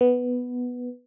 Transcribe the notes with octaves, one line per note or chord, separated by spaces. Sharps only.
B3